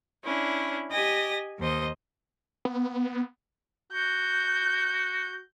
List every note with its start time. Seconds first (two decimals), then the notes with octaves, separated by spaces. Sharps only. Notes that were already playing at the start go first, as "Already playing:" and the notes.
0.23 C#4 D4 E4
0.90 G4 D#5 G#5 A#6
1.59 D#2 C5 D#5
2.65 B3
3.93 F#4 G6